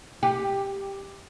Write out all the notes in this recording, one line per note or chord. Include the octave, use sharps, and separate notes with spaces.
G4